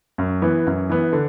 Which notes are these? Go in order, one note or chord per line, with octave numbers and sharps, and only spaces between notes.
F#2
E3 B3
F#2
E3 B3
D3